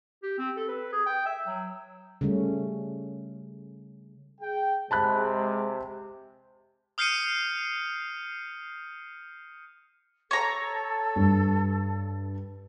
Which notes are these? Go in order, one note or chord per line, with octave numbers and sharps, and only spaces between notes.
G4
C4
A4
B4
G#4
G5
E5
F#3
C#3 G3 A3 C#4
G#4 G5
C3 G#3 A5 B5 F#6
D#6 F6 G6 C7 C#7 D#7
A4 C#5 A#5
G2